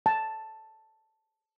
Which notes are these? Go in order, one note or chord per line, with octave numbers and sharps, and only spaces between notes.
A5